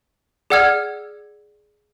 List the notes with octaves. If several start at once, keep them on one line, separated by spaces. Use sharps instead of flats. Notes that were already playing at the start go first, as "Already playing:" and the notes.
G#4 D5 F#5 E6 F6 G#6